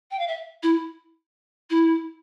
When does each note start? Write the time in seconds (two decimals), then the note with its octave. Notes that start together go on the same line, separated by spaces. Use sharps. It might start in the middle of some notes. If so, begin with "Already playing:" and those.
0.11 G5
0.19 F5
0.27 E5
0.62 E4
1.70 E4